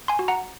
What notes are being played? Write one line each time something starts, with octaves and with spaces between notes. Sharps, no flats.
G#5 C6
F#4
F#5 A#5